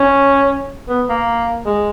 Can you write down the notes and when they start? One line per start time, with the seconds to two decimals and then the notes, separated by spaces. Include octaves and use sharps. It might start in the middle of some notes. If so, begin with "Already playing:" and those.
Already playing: C#4
0.89 B3
1.09 A#3
1.66 G#3